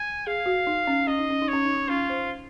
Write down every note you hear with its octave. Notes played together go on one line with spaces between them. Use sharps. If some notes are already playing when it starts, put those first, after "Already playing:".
Already playing: G#5
G#4 F5
F#4
D#4
C#4
C#4 D#5
D#4
C#4
D#4
C#4 C#5
D#4
C#4
C#4 F4
C5